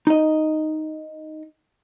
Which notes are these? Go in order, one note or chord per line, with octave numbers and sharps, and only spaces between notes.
D#4 D#5